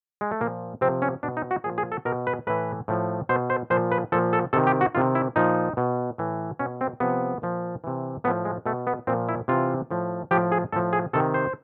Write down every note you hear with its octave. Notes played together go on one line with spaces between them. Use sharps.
G#3
A3
A#2 F3 A#3
C3 F3 C4
C#4
B2 D4
D#4
F#4
A#2 F3 G#4
G#4
A4
B2 A#4
B4
A2 E3 B4
A2 F3
B2 C5
C5
A#2 F3 C5
B4
A#2 F3 A4
A4
C3 D#3 A4
G4
F#4
C3 D#3 F4
E4
A#2 F3 D#4
B2
A2 E3
B2 C#4
C4
C3 F3 B3
A#2 F3
C3 E3
A2 F3 B3
G#3
B2 A3
B3
A#2 F3 C4
E4
C3 E3 F4
A2 F3
A2 F3 G4
G#4
A2 F3 A4
G#4
C3 D#3 A4
C5